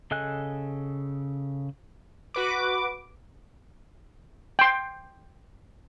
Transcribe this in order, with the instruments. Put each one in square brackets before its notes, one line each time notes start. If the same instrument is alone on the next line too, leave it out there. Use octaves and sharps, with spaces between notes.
[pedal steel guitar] C#3 A4 D#5 G#5 F#6
[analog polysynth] F#4 B4 D6
[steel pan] G5 C6